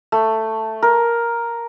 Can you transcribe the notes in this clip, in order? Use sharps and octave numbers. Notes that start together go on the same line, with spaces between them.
A3
A#4